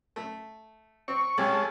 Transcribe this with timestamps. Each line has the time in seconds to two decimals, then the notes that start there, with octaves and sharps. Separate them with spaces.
0.16 A3
1.08 C4 C#6
1.38 C2 G#3 C#4 A4